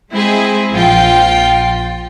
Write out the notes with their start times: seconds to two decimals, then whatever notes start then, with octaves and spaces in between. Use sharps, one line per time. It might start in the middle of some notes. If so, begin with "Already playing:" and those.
0.12 G#3 C4 E4 G#4
0.71 A#1 F3 F4 G5